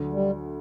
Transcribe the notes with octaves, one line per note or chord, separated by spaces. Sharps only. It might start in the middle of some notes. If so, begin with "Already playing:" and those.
Already playing: D2 D3 F#3
G3